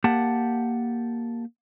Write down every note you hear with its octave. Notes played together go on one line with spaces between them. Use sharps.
A#3 G4 F#5 A5